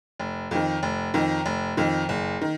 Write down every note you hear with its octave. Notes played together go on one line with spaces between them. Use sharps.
F1
F2 D#3
F1
F2 D#3
F1
F2 D#3
F#1
D#3